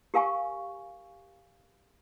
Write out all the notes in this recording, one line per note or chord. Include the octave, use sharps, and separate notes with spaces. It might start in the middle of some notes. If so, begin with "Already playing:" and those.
G4 A#4 F5 G#5 C#6